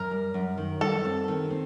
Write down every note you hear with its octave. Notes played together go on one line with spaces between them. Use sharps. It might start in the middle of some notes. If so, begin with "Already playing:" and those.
Already playing: F#2 A#4
G3
F#2
D#3
G3 A4
C4
D#3
C4